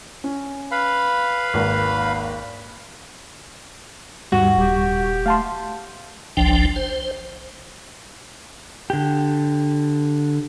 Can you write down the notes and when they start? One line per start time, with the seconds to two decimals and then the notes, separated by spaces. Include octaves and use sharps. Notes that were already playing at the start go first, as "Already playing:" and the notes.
0.24 C#4
0.71 B4 F5 B5
1.54 G#1 D#2
4.32 D#2 G#2 G3 F#4
4.57 D#1 G4
5.26 A3 F5 A5 C6
6.37 G1 C2 F3 D4 G5
6.76 C5
8.90 D3 G4